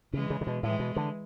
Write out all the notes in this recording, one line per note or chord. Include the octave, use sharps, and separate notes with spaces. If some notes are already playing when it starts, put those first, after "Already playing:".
C#3 E3 G#3
C#3
C#3
B2
A2 E3 G#3
B2
D3